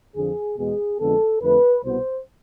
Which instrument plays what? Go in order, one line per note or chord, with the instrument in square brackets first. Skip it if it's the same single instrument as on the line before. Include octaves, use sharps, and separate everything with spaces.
[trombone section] F2 D3 F3 G#4
E2 B2 G#3 B3 G#4
F2 D3 G#3 B3 A4
F2 D3 A3 C4 B4
C2 B2 B3 C5